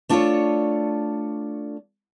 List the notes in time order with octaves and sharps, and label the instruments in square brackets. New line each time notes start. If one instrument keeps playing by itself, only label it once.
[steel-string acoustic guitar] A3 D4 F4 F#4 A4 C#5